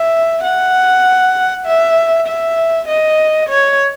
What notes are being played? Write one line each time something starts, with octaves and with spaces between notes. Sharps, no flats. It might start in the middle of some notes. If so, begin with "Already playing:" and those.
Already playing: E5
F#5
E5
E5
D#5
C#5